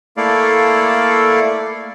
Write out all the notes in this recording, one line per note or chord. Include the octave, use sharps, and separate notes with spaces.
A3 A#3 E4 A4 D5 F5